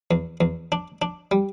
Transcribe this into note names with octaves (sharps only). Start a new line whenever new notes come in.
E2
E2
D4
D4
G3